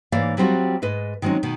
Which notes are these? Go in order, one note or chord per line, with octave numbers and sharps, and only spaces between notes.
G#2 E3 A#3 C#5 D5 F5
F#3 G3 B3 C4 F4 F#4
G#2 G#3 B4 D#5
D#3 F#3 G#3 C4 C#4
B2 D#3